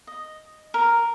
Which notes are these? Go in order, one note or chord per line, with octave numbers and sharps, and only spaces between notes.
D#5
A#4